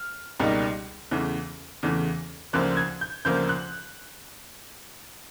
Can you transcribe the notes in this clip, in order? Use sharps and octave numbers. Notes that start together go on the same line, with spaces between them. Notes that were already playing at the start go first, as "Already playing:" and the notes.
Already playing: F6
C#2 B2 G3 A#3 D#4
E2 C#3 E3 A3
E2 C#3 E3 A3
D2 C#3 F3 A#3 F#6
G#6
G6
D2 C#3 F3 A#3 G6
F#6